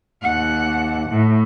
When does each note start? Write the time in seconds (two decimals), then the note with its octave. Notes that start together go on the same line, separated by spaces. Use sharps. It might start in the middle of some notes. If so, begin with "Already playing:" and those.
0.23 D#2 F#5
1.09 A2